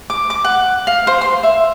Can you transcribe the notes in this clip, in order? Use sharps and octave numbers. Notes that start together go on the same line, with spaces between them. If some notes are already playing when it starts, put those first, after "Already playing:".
D6
D6
F#5
F5
C5
C6
E5